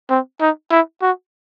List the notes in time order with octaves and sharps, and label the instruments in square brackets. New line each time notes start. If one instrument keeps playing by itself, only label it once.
[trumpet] C4
D#4
E4
F#4